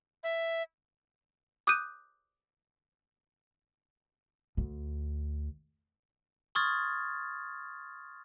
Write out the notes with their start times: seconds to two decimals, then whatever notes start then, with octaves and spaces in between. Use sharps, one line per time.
0.24 E5
1.67 D6 D#6 F#6 G6 D#7
4.57 D2
6.55 C6 C#6 D#6 F6 G#6 A6